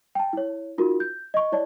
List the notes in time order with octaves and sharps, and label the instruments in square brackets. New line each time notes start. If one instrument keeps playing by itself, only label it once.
[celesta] G5 A5
E4 C#5
D#4 F4 F#4 A#4
G6
D#5 C#6
E4 C#5 D5 A5